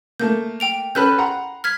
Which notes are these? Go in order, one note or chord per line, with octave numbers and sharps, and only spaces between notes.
A3 A#3 G6
G5 D7 F7
C#4 A4 B4 B5 F#6 G6
F#5 A#5 C6
F6 G#6 B6